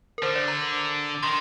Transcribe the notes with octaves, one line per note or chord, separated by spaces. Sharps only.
A#4
D3 C5
D5
A#5
D6
D#3 C6